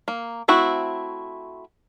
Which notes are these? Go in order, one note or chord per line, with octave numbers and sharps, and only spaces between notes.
A#3
A3 C4 E4 F#4